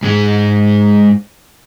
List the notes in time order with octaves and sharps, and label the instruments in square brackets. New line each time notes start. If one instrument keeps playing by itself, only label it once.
[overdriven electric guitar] G#2 G#3